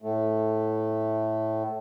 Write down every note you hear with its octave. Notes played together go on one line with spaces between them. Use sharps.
A2 A3